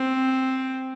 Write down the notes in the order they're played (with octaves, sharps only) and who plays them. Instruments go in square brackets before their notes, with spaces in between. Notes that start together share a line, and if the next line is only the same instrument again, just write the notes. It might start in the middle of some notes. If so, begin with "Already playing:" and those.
Already playing: [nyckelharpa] C4